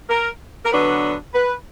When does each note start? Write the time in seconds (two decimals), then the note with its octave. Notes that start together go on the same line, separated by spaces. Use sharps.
0.10 A#4
0.65 A#4
0.72 D3 F#3 B3 D4 B4
1.34 B4